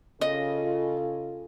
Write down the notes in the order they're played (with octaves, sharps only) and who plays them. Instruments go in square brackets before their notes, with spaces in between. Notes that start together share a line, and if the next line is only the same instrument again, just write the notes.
[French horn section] C#3 F4 [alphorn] A4 [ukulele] D#5